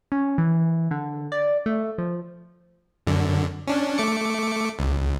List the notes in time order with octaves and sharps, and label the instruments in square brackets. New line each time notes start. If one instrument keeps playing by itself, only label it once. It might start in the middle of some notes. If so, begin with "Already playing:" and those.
[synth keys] C#4
E3
D3
D5
A3
F3
[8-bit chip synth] F#2 D3
C#4 D4
A3 D6 C#7
C#2